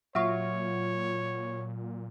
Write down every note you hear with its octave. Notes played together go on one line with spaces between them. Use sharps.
A#2 F#3 F4 C#5 E5 C#6